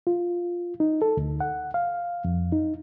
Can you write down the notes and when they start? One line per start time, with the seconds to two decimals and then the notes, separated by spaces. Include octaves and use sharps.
0.07 F4
0.80 D#4
1.02 A4
1.17 D2
1.40 F#5
1.74 F5
2.25 F2
2.52 D#4